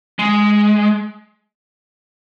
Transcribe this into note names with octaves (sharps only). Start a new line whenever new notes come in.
G#3